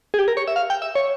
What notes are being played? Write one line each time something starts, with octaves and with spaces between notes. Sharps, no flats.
G#4
G4
A#4
C#5
E5
F5
G5
E5
C#5